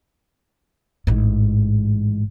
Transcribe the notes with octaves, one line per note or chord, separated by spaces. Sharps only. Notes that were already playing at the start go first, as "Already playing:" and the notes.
A1 G#2